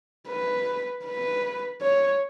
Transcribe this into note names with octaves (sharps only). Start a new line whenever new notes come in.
B4
B4
C#5